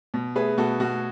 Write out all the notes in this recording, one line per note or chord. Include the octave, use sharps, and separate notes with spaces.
B2
A3 G#4 B4
B2 F#4 A4
B2 F#4